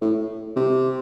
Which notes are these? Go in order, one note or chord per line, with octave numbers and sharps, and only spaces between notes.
A2
C3